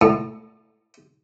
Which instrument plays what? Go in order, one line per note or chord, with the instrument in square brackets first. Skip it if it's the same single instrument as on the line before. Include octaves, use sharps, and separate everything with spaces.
[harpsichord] A2